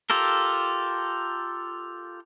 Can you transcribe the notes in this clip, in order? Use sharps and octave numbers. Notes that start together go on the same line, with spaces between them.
F4 G4 A4 A#4